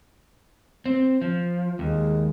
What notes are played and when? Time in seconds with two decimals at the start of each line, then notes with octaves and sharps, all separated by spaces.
0.86 C4
1.22 F3
1.79 D#2 G#3